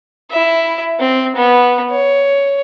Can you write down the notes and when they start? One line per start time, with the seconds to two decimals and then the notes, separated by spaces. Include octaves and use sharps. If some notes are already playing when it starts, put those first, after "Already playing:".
0.31 E4 E5
0.99 C4
1.35 B3
1.90 C#5